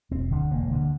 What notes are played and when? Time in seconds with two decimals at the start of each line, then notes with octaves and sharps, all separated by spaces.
0.11 E1 C4
0.31 D2 D3
0.51 E1 A#3
0.70 D2 D3